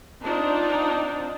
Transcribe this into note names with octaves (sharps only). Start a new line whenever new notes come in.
C4 D4 D#4 F4